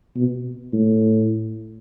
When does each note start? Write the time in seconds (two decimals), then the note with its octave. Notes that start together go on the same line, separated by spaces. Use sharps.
0.16 B2
0.73 A2